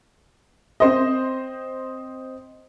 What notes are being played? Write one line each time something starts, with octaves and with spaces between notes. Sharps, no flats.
C4 C5 D#5